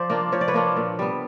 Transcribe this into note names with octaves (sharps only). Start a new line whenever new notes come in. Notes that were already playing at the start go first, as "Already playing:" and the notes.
Already playing: F3 C5 D5
A#3 D4 F4
F3 C#5
D5
B4 C#5
A#3 D4 F4
A#2
G3 B3